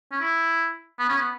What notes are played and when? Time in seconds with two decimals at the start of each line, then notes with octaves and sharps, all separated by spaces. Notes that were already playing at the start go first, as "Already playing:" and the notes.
0.12 C#4
0.21 E4
0.99 B3
1.09 C#4
1.18 B3